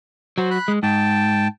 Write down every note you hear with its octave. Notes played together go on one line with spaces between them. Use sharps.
F#3 F#4 C5
B5 F#6
G#3
G#2 G5 A5